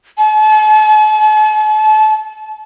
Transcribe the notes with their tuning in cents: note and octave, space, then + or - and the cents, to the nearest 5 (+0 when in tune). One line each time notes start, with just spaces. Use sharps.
A5 -45